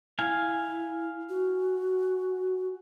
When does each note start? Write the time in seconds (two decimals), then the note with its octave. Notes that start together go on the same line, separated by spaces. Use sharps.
0.19 E4 F5 G#5
1.29 F#4